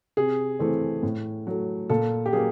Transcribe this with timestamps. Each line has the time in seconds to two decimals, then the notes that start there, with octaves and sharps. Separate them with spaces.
0.17 C3 G#4
0.59 E3 A3 C4
1.03 A2
1.47 F#3 A3
1.90 A#2 A4
2.26 G4
2.33 F#3 A#3 G#4